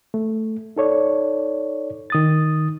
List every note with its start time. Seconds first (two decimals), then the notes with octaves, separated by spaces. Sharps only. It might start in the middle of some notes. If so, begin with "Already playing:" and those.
0.14 A3
0.76 D#4 A4 C#5 D5
2.10 D#3 D#6 A6